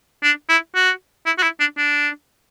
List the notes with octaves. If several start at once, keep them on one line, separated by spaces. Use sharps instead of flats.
D4
E4
F#4
E4
F#4
E4
D4
D4